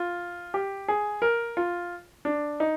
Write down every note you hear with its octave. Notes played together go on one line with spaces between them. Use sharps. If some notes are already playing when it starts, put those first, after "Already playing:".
Already playing: F4
G4
G#4
A#4
F4
D4
D#4